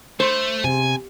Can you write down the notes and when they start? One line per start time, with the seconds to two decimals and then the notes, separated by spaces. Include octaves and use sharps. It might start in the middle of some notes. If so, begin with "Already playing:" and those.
0.20 A3 C5
0.64 C3 G#5